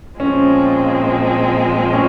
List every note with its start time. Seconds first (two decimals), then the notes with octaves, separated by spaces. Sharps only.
0.20 A#2 F3 G#3 C4 C#4
1.93 C#4